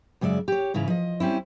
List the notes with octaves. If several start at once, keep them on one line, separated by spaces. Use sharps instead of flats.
F#2 C#3 G#3 D5 E5
G4 C#5
G#2 C#3 E3 E4 A#5
F3 D#5
G3 C4 C#4 E4